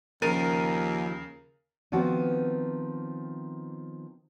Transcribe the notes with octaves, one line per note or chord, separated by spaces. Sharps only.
D#2 C#3 F3 A#4 A6 D#7
D#3 F3 B3 C4 F#4